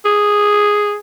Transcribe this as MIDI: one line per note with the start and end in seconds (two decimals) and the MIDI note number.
0.05 0.96 68